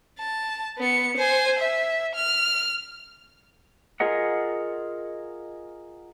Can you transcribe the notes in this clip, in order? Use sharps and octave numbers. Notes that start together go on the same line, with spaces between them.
A5
B3 C#7
C5 G#5
E5
F6
F4 G#4 A#4 D#5 F#5